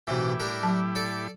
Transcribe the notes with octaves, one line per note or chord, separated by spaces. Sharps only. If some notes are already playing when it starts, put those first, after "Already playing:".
B1 A2 C3 E3 E4 G4
G3 D4 A#4
F#3 A5
A4 D5 D6